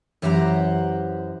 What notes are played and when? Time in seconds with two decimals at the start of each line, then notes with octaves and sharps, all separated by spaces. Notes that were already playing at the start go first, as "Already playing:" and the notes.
0.22 F#2 E3 G4 C5 F#5 A#5